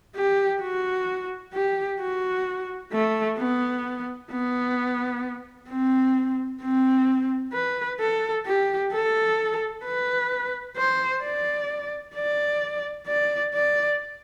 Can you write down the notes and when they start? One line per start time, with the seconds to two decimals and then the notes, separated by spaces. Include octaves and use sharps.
0.16 G4
0.62 F#4
1.53 G4
2.00 F#4
2.93 A3
3.38 B3
4.31 B3
5.69 C4
6.62 C4
7.53 B4
7.99 A4
8.46 G4
8.93 A4
9.85 B4
10.77 C5
11.24 D5
12.15 D5
13.07 D5
13.54 D5